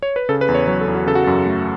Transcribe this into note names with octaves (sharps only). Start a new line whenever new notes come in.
C#5
B4
C#3 A4
B4
E2
C#5
F#3 C#5
A4
E2
F#4
C#3 A4
F#4
F#2 A4
A3